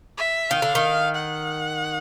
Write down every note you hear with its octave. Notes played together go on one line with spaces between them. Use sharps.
E5
D#3 F5
D3
D#3
F#5